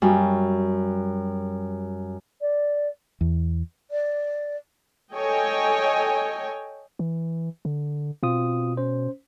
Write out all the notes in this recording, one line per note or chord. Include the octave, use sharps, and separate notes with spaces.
F#2 G3
D5
E2
D5
A4 C#5 D#5 G5 G#5
E3
D3
B2 C4 F4 D#6
C#4 C5